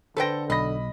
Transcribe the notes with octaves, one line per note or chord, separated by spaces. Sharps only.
D3 A4 B4 C5 G5 A#6
B1 D#5 B5 A#6